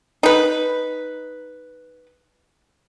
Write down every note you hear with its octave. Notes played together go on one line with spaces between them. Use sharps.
D#4 B4